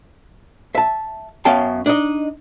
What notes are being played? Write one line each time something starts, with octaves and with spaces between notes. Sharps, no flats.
E5 A5
F#2 B3 C#4 F5 G5 A5
D4 D#4 D#5